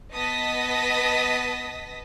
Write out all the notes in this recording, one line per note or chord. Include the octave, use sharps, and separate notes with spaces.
B3 D#5 A5 D#6 A#6 B6